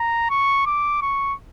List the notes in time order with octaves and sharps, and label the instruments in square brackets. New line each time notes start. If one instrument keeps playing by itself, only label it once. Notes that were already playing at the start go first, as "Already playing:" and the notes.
Already playing: [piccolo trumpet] A#5
C#6
D6
C#6